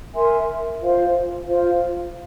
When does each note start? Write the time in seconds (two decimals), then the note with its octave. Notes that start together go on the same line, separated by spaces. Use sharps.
0.14 A#4 E5 G#5 C6
0.80 F4 C5 F5
1.46 F4 C5 F5